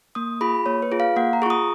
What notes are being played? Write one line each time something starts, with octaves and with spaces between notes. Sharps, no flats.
A#3 D#6
F4 G#4 B5
A#3 C#5
B4
F4 G#4
F5
A#3 F#5
A#5
F4 G#4 C#6 D#6